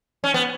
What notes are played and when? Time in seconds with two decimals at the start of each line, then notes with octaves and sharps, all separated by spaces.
0.24 C#4
0.34 B3